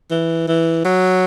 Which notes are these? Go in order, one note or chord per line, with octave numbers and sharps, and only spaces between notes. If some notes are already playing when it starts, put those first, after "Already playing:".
E3
E3
F#3